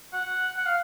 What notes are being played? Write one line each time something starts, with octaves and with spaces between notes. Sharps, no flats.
F#5
F#5
F5